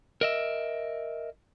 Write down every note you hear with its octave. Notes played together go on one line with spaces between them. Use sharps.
A#4 D#5 E5